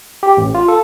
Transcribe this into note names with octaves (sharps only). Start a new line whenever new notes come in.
G4
A1
F4
A4